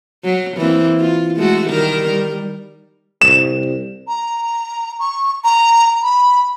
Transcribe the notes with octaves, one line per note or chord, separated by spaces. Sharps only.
F#3
E3 A#3 C4
F4
G#3 A3 F#4
D#3 G3 A#4
G3
C2 E7
A#5
C#6
A#5
B5